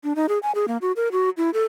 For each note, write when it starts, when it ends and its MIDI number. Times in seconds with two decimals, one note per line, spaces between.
0.04 0.13 62
0.16 0.26 63
0.29 0.39 68
0.43 0.52 80
0.55 0.66 68
0.68 0.77 58
0.82 0.92 66
0.96 1.08 70
1.12 1.30 66
1.37 1.50 64
1.54 1.64 69